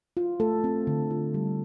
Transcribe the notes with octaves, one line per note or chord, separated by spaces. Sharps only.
F4
A3 A4
C4
D3
F4
G3